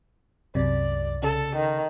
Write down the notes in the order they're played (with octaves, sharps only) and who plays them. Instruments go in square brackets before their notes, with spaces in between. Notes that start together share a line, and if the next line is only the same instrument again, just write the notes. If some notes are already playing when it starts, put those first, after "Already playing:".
[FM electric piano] C2 C3 [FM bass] F#2 [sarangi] D5
[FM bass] C#3 [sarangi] A4
[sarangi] D#3